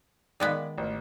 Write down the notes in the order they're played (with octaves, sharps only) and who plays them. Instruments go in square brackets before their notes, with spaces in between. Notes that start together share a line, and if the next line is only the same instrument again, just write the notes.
[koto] D#3 G#3 B3 [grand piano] D5
[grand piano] A1